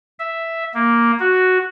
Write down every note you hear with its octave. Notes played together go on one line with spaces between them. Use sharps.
E5
A#3
F#4